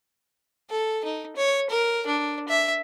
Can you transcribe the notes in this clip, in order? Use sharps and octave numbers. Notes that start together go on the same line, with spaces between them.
A4
D#4
C#5
A#4
D4
E5